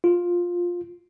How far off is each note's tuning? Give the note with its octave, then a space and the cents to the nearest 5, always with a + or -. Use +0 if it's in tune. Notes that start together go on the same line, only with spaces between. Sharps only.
F4 +10